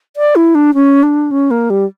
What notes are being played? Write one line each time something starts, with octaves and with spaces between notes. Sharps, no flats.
D5
E4
D4
C#4
D4
C#4
A#3
G3